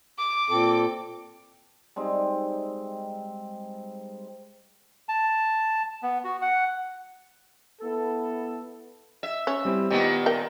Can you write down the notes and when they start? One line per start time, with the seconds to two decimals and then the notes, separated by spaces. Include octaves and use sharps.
0.18 D6
0.50 A#2 C4 A4
1.96 G3 G#3 C4 D#4
5.09 A5
6.03 B3
6.24 F#4
6.42 F#5
7.82 B3 E4 A4
9.23 E5
9.47 C#4
9.65 G3 C4 E4
9.90 A#2 D#3 B3 G4
10.26 A#4 G5